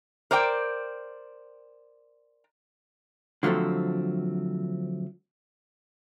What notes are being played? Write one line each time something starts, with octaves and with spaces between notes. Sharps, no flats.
A#4 C5 D5 G5
D3 F3 F#3 A3 C4